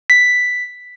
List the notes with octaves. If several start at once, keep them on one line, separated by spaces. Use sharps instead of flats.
B6